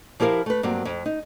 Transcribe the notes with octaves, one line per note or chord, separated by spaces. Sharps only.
F3 E4 G4 A#4 F5
A3 B4
G2 F#3 A#3 C4
F2
D#4